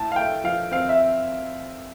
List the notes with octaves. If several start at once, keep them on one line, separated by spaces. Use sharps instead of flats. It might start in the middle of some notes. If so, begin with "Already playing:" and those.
Already playing: A2 A5
F5
A3 G5
F3 F5
C4 F5
E5